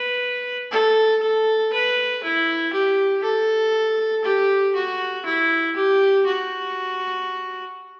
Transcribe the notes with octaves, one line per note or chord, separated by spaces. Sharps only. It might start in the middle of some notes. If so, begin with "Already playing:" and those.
Already playing: B4
A4
A4
B4
E4
G4
A4
G4
F#4
E4
G4
F#4